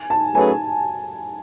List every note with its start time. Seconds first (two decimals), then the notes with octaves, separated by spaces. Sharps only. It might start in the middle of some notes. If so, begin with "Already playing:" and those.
Already playing: G#5
0.10 A5
0.35 F#3 A3 C#4 G#4 B4 G#5